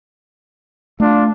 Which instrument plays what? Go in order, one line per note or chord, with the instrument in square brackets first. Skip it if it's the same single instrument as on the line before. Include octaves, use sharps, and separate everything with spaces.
[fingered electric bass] A3 [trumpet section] D4 F4